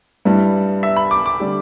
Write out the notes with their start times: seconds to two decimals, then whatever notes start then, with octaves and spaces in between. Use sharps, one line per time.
0.25 G2 G3 E4 B4
0.83 E5
0.96 B5
1.11 D6
1.26 D6
1.40 D3 G3 D4 G4